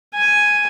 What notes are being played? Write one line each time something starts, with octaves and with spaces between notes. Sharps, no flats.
G#5